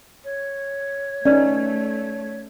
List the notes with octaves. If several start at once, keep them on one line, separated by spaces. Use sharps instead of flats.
C#5
A3 C#4 D#4 B4 D5